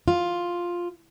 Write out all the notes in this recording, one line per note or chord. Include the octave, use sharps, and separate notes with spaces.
F4